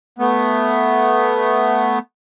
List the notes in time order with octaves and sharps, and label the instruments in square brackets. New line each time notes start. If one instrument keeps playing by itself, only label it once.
[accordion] A3 B3